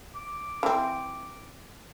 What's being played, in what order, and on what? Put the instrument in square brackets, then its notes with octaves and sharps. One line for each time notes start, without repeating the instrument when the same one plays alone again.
[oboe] D6
[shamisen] E3 C4